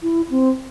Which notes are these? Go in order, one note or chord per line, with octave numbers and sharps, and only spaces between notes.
E4
C4